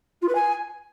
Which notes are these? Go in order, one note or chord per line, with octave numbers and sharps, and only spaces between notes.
F4
B4
G#5